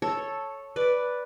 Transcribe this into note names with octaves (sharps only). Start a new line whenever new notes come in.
A4 C#5
B4 D5